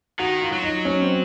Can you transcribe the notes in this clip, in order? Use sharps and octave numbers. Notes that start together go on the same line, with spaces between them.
D#3 F#4
F4
F#3
D#4
C#4
C4